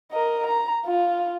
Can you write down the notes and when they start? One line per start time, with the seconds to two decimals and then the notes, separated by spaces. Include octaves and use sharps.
0.11 A#4 D#5
0.47 A#5
0.86 F4